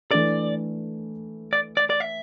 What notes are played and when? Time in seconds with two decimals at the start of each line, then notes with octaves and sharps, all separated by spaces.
0.11 E3 A3 D4 A4 D5
1.53 D5
1.77 D5
1.90 D5
2.00 E5